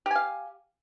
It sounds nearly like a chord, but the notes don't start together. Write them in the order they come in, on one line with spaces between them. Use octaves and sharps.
G4 G#5 F5